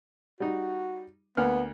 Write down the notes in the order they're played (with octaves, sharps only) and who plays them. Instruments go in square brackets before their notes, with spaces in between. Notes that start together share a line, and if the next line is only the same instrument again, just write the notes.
[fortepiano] G3 D#4 [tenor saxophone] F#4
[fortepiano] D2 A#3 F6 [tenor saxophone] B3